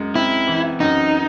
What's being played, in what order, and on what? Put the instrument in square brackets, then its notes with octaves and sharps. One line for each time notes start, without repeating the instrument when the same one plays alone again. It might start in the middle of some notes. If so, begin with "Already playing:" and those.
Already playing: [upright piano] F#2 G#3
[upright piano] C4 [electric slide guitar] E4
[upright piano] E3
[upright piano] F#2 [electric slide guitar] D#4